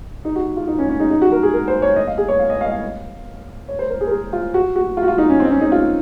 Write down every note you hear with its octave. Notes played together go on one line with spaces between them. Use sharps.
D#4
F#4
F4
D#4
C#4
C#4
D#4
D#4
F#4
A#4
G#4
A#4
C5
C#5
D#5
F5
G#4
C#5
F5
D#5
F5
D#5
F5
C#5
C5
A#4
G#4
A#4
G#4
F4
F#4
F#4
F4
F#4
F4
D#4
C#4
C4
D#4
C#4
D#4
F4